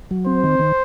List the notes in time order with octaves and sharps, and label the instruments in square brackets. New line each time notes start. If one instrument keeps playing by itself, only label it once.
[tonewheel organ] F#3
[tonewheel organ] C4 [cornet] C5
[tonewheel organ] D#3
D#3